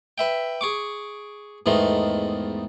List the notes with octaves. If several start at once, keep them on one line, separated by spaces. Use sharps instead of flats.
B4 E5 G5
G#4 C#6 D6
E2 G#2 D#3 A3 B3 C6